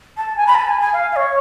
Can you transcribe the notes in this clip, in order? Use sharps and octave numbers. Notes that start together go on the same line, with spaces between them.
A5
G#5
B5
A5
G#5
G#5
F5
F5
C#5